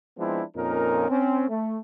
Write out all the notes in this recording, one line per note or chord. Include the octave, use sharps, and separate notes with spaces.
F3 G#3 B3 C4 D4 E4
F2 A#2 C#4 D#4 A#4
C4 C#4
A3